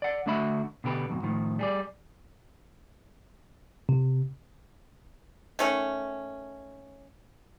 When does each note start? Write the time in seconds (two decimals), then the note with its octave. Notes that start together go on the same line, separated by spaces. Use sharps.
0.02 D5 F#5
0.26 D3 A3 D4 F#4 E5 B5
0.84 B2 D3 G4 B4
1.10 F2 G#2 B2
1.23 A2 D#3 F3
1.59 G3 G#4 D5
3.89 C3
5.59 D#3 A3 C#4